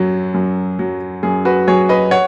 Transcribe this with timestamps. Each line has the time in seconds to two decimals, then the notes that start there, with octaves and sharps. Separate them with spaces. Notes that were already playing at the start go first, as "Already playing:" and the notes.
Already playing: F#2 F#3
0.34 F#2
0.79 F#3
1.23 F#2 G#4
1.45 F#4 B4
1.67 F#3 G#4 C#5
1.89 B4 D#5
2.11 C#5 F#5